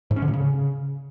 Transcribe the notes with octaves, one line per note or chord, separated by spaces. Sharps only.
G#2
C#4
D3
A2
C#3